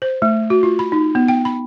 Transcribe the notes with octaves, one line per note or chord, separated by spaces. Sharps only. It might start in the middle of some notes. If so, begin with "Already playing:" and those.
C5
A3
F#4
F4
B5
D#4
B3
G5
B5